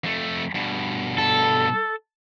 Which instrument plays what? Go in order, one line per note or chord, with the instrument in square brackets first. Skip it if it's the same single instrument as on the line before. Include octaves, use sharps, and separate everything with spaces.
[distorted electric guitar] F2 A3
G2 B2
[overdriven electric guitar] A4